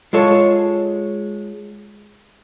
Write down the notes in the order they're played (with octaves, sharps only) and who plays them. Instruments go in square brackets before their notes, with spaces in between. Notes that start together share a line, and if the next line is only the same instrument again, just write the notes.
[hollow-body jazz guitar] G#3 F4 A4 C#5